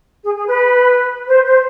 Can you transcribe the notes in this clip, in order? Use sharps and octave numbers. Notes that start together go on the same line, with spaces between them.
G#4
G#4
B4
C5
C5